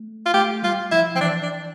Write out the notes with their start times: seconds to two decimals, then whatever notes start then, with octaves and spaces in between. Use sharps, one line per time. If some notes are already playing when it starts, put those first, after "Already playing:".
Already playing: A3
0.26 F4
0.34 A3 G4
0.63 G3 F4
0.92 F3 E4
1.15 F3 C4
1.21 E3 D4
1.42 D4